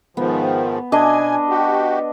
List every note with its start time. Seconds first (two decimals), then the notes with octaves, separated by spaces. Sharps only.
0.17 G#2 D#3 F3 B3
0.92 B2 D4 D#5 G#5
1.49 F#4 G4